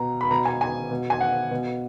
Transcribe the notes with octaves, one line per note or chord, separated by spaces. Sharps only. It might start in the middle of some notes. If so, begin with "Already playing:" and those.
Already playing: B2 A#5
B5
B2 A#5
G#5
G#5
B2
G#5
F#5
B2